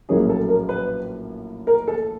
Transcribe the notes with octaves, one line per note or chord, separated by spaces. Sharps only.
A#1 A2 F#3 A#3 C#4 G#4
A4
A#4
B4
A#4
A4